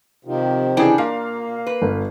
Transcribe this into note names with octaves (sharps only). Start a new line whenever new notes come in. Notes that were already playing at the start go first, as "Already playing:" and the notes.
C3 D#3 F3
C#3 E3 D4 G#4 G5
A#2 A#3 F5
B4
G1